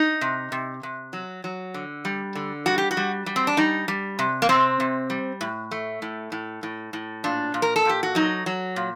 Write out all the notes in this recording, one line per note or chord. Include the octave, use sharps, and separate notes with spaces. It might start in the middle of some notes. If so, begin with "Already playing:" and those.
Already playing: D#4
C3
C3
C3
F#3
F#3
D3
G3
D3
G3 F#4
G4
F#4
G3
G3
C4
D4
G3 D#4
G3
C3
A#3
C3 C4
C3
G3
A2
A3
A2
A2
A2
A2
A#2 D4
A#2
A#4
A4
A#2 G4
F#4
F#3 D#4
F#3
A#2